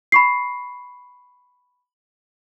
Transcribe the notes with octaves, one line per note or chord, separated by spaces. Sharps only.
B5 C#6 C7